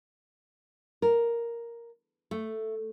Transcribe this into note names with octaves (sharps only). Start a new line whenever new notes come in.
A#4
A3